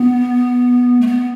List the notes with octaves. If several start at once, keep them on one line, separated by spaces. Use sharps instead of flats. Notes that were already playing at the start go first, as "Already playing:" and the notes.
Already playing: B3
A3
B3